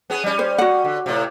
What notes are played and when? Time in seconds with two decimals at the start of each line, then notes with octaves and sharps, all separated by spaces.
0.10 B3 C#4 G#4
0.24 G3 C#4
0.39 C5
0.58 F#4 F#5
0.84 D3
1.06 A2 C3